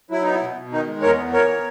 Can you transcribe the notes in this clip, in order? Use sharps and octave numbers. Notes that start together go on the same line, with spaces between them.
F#3 E4
B3 D#4
E4
B2
B2
D#3 D#4
G#3
E2 A#4 C#5
B3
E3 A#4 C#5
B3